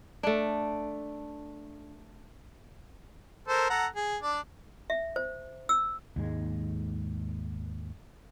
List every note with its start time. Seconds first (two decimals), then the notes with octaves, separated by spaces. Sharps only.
0.23 A3 D4
3.48 A4 A#4 C5
3.70 A4 F#5 A#5
3.96 G#4
4.22 D4 D5
4.90 E5
5.16 C5
5.69 E6
6.16 D#2 G#2 G#3